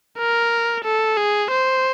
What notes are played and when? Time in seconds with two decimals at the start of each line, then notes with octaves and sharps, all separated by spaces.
0.18 A#4
0.85 A4
1.17 G#4
1.51 C5